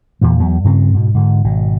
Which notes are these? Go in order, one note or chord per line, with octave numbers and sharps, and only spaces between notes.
E2 A#2 E3
E2 F#3 B3
G2 C#3 C4
G#2 B2
G#2 D3
G#1 B2